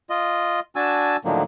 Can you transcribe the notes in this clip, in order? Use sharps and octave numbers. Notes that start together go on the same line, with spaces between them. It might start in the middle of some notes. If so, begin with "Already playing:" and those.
F4 D#5
D4 F#4 G#5 A5 E6
A2 D3 D#3 F3 F#3 A#3